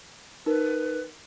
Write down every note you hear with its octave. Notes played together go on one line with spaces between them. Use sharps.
D#4 A#4 B4